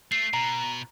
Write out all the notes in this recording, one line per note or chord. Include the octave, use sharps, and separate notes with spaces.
A3 C7
B2 A#5